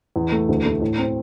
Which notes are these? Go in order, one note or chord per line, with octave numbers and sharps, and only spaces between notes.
E2
A3
D2
A3
A2
C4